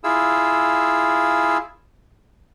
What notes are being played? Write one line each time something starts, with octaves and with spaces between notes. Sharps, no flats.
E4 F4 G#4 E6